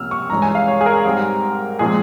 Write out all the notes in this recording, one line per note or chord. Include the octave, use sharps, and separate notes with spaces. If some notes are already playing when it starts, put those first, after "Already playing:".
Already playing: C2 C3 F3 A#3 C#4 E6 F6
C#6
G2 E3 G#3 C#4 A#5
G#5
F5
C#5
G#4
A#4
G#2 G3 C4
A#2 F3 G#3 C4 G#4